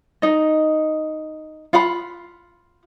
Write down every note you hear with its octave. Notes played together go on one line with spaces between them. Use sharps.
D#4 D#5
F4 F5 F#5 B5